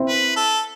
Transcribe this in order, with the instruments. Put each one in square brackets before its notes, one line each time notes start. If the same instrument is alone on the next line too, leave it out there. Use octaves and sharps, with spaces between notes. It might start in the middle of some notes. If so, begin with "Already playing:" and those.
Already playing: [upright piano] C4 E4
[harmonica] B4
A4